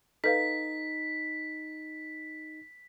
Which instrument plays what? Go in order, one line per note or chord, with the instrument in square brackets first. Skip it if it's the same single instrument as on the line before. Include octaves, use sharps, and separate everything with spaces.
[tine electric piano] D#4 [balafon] A4 B4 F5 [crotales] B6